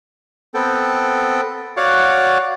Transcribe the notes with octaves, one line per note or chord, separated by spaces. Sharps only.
B3 C4 A4 G5
F#4 C#5 D5 F5 F#5